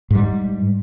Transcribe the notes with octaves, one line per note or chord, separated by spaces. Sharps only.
G#2 G3